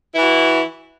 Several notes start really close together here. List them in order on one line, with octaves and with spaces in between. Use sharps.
E4 E3 F#4